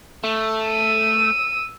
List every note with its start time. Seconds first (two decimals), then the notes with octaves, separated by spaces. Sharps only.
0.24 A3
0.69 E6 D#7